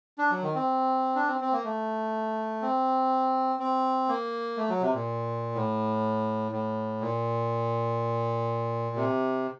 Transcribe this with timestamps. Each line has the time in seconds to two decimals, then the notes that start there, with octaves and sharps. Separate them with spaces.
0.18 D4
0.31 F#3
0.42 D#3
0.55 C4
1.15 D4
1.28 C4
1.41 C4
1.53 A#3
1.64 A3
2.62 C4
3.60 C4
4.09 A#3
4.57 A3
4.69 F#3
4.82 C3
4.94 A#2
5.55 A2
6.52 A2
7.01 A#2
8.96 C3